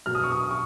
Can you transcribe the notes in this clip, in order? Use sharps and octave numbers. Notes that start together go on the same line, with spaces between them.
B2 F#3 F6
D#6
C#6
D#6
C#6